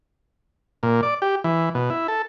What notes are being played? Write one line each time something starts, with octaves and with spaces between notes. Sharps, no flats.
A#2
D5
G4
E3
B2
E4
A4